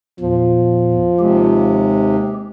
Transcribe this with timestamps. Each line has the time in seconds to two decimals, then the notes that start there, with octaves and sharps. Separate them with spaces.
0.20 E2 A#2 F3
1.19 D#2 C3 G#3 G4